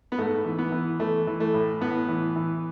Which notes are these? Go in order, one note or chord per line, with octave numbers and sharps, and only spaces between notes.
B3
G#2 A3
E3
B3
E3
E3 A3
E3
A3
A2
A2 B3
E3
E3